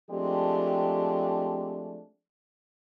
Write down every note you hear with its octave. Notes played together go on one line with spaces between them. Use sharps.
F3 G#3 A3 C4 D4 G4